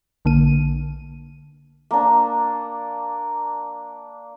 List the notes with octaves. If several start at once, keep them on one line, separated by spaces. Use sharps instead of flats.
A#1 D3 A#3 D#7
A#3 D4